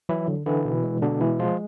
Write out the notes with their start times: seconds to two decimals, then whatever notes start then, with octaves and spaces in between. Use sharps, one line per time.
0.09 E3 F#3 E4
0.28 D3
0.46 D3 E3 E4
0.65 B2
0.84 G#3
1.02 B2 D3 D4
1.21 E3 G#3 E4
1.39 F3 G#3 F4